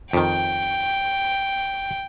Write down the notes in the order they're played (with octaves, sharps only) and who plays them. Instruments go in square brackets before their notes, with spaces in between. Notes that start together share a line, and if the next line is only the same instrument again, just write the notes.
[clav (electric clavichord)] F2 D#3 [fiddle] G5